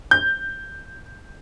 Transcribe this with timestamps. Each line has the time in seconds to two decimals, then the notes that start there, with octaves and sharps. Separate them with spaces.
0.11 G6